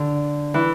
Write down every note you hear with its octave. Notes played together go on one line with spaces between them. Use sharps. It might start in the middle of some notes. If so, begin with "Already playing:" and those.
Already playing: D3
E3